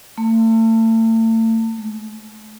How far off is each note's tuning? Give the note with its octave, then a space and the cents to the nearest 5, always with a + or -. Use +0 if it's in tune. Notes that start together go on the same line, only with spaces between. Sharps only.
A3 +40
A3 -45